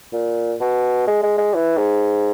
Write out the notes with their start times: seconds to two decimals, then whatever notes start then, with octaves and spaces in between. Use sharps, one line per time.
0.13 A#2
0.60 B2
1.07 G#3
1.23 G#3
1.38 G#3
1.54 E3
1.78 G#2